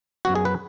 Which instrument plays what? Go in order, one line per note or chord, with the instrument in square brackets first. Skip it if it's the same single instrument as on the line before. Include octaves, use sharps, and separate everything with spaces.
[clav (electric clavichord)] F#2 F#3 B3 F#4
G#4
B4